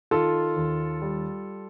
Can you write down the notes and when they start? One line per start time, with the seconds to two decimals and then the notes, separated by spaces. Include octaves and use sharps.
0.11 D#3 F4 A4
0.56 D#2
1.02 G3